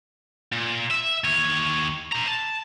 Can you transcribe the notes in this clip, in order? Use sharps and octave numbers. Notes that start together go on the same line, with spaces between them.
A#2
E5
D#2 C#5
C5 A#5
A5